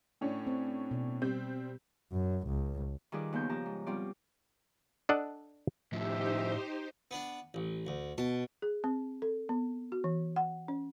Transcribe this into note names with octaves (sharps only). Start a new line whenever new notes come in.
A2 C#4 D4
C4
B2
G3 C4 G6
F#2
C#2
D#3 G3 F4 G#4 B4 D5
D#2 C#3 B3 C6 G6
F3 G4 A5 A#5
G#2
B2 G3 C4 F4 D5
D4 A4 D5 D#5 F#5 A5
A2 F3 D#4 G4 C5 E5
B3 D4
A1
D2
B2 A5
G#4
C4
A4
B3
F#4
E3
F#5
C#4